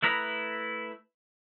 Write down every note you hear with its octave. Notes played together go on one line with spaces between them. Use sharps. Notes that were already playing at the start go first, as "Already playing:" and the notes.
A3 E4 B4 A#5 D#6